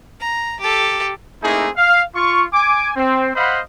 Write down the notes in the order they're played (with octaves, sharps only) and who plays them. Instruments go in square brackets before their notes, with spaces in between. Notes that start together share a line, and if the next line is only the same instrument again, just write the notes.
[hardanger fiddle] A#5
G4 A4
[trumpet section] A3 A#3 C4 D#4 E4 G#4
F5
F4 C#6
G#5 D6
C4
C5 D#5 F5 F#5 B5